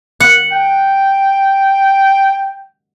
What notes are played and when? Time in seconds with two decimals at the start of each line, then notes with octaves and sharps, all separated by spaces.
0.20 F#5
0.53 G5